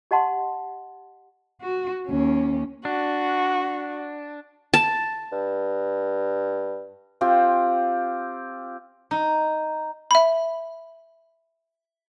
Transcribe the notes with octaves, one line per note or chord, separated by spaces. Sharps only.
G4 D#5 F#5 A5 C6
F#4
D#2 C#4
D4 F#4
A5
G2
C4 F4 G4
D#4
E5 B5